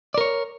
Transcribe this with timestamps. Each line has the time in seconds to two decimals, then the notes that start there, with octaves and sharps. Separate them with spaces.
0.14 D5
0.18 A#4
0.21 C#5